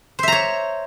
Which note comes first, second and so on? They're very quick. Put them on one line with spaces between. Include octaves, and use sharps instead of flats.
C5 E5 A#5 C#5